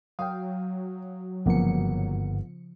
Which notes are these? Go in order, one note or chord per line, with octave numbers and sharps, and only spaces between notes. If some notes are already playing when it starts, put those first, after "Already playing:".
F#3 F5 G5 D#6
G1 G#2 C#3 F3 A#3 B3 C#7